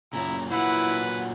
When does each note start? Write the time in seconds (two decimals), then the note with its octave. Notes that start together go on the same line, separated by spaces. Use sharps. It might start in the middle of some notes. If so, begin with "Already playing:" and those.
0.13 F#2 A#2 C#3 E4 A#5
0.51 A#2 F#3 E4 B4 F#5